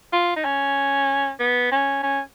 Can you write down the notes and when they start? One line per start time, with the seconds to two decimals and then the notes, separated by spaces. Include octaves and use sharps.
0.13 F4
0.36 D#4
0.45 C#4
1.40 B3
1.72 C#4
2.03 C#4